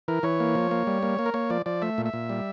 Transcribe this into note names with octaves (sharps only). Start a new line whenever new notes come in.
E3 A#4
E3 C#5
A#3
F3
A#3
G3
A#3
A#3
A#4
A#3 C#5
F3 D5
F3 D5
A3 E5
A#2
E5
A#2
G3